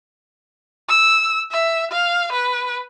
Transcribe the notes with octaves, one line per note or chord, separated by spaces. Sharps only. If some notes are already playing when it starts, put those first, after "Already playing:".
E6
E5
F5
B4